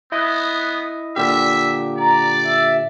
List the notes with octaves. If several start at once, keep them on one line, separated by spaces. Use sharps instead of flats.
B3 E4 D#5
A#2 D3 G4 E5
D5 A#5
E5